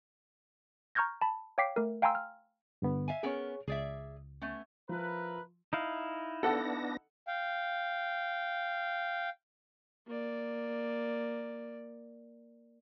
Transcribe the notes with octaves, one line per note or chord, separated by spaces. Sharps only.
A#5 C#6 F6 G6 G#6 A#6
A5 B5
C#5 F5 G5 D6 B6 C7
A3 A#4
F5 G5 G#5 A#5 C6 E6
F6
G2 D3 B3
E5 F5 G#5
B3 C#4 G#4 A#4 C#5
C#2 G#4 D5 E5
A3 B3 C#4
F3 E4 A#4 B4
D#4 E4 F5
B3 D4 A4 F#5 A#6
F5 G5
A#3 D5